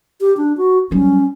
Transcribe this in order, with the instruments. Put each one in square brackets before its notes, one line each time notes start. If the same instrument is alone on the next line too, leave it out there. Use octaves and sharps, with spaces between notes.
[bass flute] G4
D4
F#4
[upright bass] F#3 G3 [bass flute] C#4